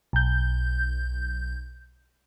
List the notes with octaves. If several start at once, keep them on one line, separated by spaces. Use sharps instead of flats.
B1 G6